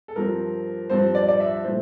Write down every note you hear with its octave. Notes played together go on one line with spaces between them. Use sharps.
A4
G2 F3 C4 A#4
G2 F3 C4 C5
D5
D5
E5
A#2 F3 A3 C5